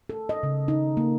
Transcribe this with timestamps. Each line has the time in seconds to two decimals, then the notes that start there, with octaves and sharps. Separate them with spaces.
0.10 A4
0.29 D#5
0.43 C#3
0.68 D#4
0.97 A#3